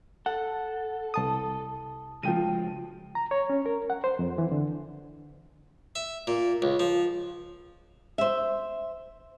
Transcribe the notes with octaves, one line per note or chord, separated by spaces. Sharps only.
A4 F#5
C2 A5 D#6
C#3 F3 F#3 G#3 G5 D#7
A#5
C#5
C#4
A#4
F#5
C5
F2
E3
D3
E5
A#2
C#2
F3
C5 E5